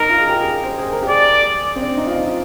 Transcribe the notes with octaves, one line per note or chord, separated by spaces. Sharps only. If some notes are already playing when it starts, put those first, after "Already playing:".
Already playing: D#4 A#4
F4
G#4
G4
G#4
A#4
C5
G#4
A#4
G4
G#4 D5
C4
D4
D#4
F4
D#4